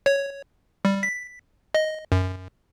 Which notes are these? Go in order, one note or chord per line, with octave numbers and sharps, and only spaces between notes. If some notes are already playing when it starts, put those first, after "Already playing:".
C#5
G3
B6
D#5
F#2